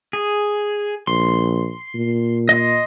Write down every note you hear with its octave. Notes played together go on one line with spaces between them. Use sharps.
G#4
A#1 C6
A#2
D#5 C6